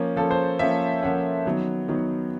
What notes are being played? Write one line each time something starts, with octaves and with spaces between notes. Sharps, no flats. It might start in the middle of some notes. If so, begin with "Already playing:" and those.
Already playing: F3 A#3 C#4
F3 A#3 C#4 A4
C5
F3 A#3 C#4 E5
F3 A#3 C#4 F#5
D#3 F#3 B3
D#3 F#3 B3